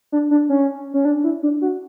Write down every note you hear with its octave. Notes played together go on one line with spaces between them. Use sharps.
D4
D4
C#4
C#4
D4
E4
D4
F#4